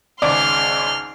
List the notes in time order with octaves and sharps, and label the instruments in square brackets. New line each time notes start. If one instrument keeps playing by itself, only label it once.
[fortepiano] G#1 C#2 D5 [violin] C6 F6